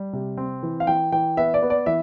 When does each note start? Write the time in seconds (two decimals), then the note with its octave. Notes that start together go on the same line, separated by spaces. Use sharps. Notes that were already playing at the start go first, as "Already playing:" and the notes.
Already playing: G3
0.13 C3
0.37 C4
0.63 E3
0.80 F5
0.87 E3 G5
1.12 E3 G5
1.37 B3 E5
1.54 D5
1.62 B3
1.70 D5
1.86 E3 E5